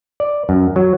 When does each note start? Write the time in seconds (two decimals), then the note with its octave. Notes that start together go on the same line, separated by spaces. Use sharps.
0.20 D5
0.49 F#2
0.76 F#3